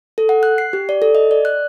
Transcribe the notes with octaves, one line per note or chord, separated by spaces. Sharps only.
A4
F#5
F#6
C7
G4
D5
A4
D#5
D5
F#6